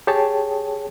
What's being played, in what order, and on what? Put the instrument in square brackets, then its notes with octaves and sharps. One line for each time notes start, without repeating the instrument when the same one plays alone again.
[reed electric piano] G4 G#4 C#5 G5 A5